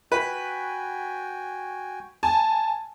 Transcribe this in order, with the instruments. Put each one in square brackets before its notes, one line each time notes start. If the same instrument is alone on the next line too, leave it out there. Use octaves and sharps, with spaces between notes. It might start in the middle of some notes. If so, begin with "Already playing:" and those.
[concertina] F#4 G5 G#5 [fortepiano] B4
[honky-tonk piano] G#5 A5